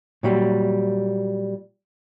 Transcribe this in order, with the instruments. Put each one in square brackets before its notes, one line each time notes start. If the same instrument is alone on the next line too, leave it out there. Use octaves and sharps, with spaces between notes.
[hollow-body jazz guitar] A#2 F#3 G3